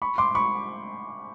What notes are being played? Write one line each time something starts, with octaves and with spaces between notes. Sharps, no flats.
B5 C#6
C6 D6
B5 C#6